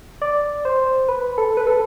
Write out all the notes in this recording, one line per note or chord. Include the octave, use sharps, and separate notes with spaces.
D5
C5
B4
A4
B4
A4